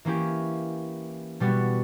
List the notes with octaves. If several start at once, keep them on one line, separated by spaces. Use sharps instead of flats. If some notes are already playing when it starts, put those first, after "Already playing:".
E3 A#3 C#4 E4 G4
B2 G3 B3 F#4